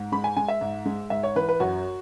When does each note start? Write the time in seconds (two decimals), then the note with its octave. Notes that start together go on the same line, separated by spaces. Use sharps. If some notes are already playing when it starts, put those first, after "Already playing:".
Already playing: G#2
0.12 G#3 B5
0.24 G#5
0.37 G#3 G#5
0.48 E5
0.61 G#2
0.86 G#3
1.10 G#2 E5
1.23 C#5
1.36 E3 B4
1.49 B4
1.60 F#2 F#4